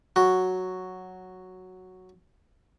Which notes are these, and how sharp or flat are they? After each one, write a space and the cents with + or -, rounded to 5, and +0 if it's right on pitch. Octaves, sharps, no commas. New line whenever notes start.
F#3 +0 F#4 +0